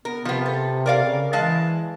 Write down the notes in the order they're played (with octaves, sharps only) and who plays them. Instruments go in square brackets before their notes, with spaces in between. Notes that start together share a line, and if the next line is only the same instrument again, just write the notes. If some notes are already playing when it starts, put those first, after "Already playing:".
[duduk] B3 [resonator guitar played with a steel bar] A#4
[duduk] C3 [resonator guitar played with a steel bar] F3 B3
[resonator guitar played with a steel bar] A4
A#4 D5 F5
[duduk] C#3
[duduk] E3 [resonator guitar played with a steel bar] G#3 F5 A5